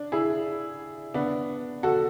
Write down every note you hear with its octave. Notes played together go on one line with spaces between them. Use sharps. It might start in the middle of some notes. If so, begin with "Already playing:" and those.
Already playing: D4
E4 G#4
B3 D4
F#4 A4